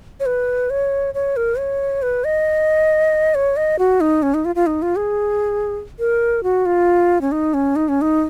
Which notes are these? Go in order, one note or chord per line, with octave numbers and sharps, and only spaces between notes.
C#5
B4
C#5
C#5
A#4
C#5
B4
D#5
C#5
D#5
F#4
D#4
C#4
D#4
F4
F4
D#4
F4
G#4
A#4
F#4
F4
C#4
D#4
C#4
D#4
C#4
D#4